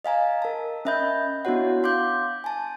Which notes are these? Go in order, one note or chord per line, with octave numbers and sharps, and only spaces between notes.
D#5 F5 G#5 A#5
A#4 A5
C#4 D#5 E5 B5 G6
B3 D4 E4 F#4 C#5 F#5
F5 C6 D6 G6
G#5 A5